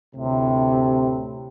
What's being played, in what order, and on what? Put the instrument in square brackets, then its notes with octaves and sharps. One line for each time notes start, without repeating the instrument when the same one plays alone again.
[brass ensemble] D2 A2 C3